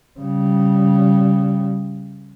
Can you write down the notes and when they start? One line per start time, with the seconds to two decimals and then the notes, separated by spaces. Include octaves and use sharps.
0.20 C#3 G3